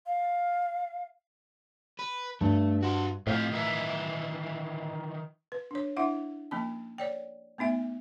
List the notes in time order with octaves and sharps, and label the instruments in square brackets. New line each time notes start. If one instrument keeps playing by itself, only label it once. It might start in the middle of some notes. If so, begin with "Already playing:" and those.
[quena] F5
[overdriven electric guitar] B4
[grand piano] G2 [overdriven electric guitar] A3
[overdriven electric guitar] F#4 C5
[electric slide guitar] F2 F4 G4 [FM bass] A2
[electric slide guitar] D#3 E3 E5
[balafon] B4
D4 C#5
D4 E4 E5 F#5
F3 A#3 C#4 A5
C#5 D5 G5
A3 B3 D#4 E5